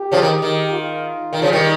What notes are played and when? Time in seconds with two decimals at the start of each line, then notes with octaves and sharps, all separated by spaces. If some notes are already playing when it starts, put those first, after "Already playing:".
Already playing: G4
0.12 C#3 F3
0.22 D#3
0.42 D#3
0.72 F4
1.33 D#3
1.42 C#3 F3
1.52 D#3 G3